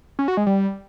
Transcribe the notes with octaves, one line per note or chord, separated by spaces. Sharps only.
C#4
F#4
G#3
G3